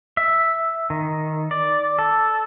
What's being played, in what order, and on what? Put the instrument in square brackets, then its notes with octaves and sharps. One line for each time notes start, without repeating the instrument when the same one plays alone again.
[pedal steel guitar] E5
D#3
D5
A4